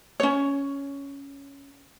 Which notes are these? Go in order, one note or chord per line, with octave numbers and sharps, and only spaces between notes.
C#4 C#5